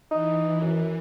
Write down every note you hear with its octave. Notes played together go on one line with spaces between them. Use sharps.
E3 D#4
F#2